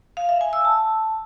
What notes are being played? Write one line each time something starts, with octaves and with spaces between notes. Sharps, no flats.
F5
E5
G#5
E6
A5